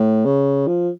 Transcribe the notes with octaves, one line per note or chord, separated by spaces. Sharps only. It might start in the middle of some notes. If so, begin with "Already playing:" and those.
Already playing: A2
C#3
F3